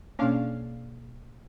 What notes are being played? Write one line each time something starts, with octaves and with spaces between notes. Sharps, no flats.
B2 A#3 C#4 D4 F5